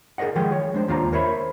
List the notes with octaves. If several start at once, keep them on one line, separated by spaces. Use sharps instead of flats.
G#4 A#4 C#5 D#5 F#5
D#3 F3 G#3 G#4 G5
C#5
G#3 D4 C5
D#2 D4 F4 G#5 A#5
A#4 C5 C#5 E5 B5